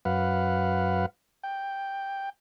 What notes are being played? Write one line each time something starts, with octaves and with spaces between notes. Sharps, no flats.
F#2 B4 F5 F#5
G5